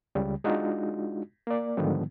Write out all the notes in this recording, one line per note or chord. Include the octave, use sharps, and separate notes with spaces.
C#2 C#3 G3
G#3 D4 D#4 F4 F#4
A#3 D5
G#2 D3 D#3 F3 G3 B3